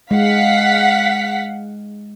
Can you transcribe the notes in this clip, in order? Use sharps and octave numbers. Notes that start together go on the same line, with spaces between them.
G#3 F5 F#5 B6